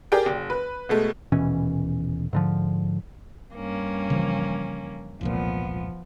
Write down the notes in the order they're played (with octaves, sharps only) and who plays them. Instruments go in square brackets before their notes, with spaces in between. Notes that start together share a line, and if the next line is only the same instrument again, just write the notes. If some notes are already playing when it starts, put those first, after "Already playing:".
[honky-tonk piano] G4 G#4 A#4 D5 G5
F#1
B4
B2 G#3 A3
[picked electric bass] D#1 B2 E3 C#4
G#2 D3 F3
[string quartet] G2 A#3 C#4
[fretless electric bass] C#3 E3 F3
[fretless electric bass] E1 C2 A#2 [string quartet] F3 B3